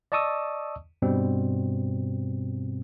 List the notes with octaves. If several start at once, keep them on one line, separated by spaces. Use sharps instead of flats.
D5 D#5 A5 C#6 D#6 E6
G2 B2 G3 C4